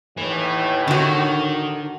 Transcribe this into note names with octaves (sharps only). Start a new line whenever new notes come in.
D#2 A2 E3
D3 D#3 F#4